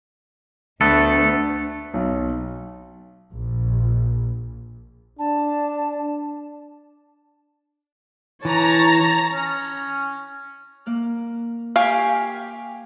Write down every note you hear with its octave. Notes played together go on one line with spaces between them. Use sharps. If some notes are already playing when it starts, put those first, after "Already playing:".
D2 A3 B3 A4
B1
A#1
D4 A5
E3 C#5 A5 A#5
C#4
A#3 F6 F#6
G4 F5 G#5 C6 C#6